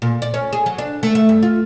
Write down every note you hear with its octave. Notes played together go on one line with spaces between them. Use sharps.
A#2
D5
C#4
G#4
F#3
D4
A3
A3
G2
F4